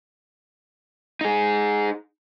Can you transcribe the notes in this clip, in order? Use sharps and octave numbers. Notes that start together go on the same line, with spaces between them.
D#4 G#4